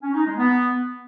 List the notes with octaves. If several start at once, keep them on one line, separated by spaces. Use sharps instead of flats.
C#4
D#4
G#3
B3